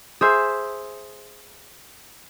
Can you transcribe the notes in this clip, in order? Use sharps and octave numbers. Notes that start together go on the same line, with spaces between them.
G#4 C5 E5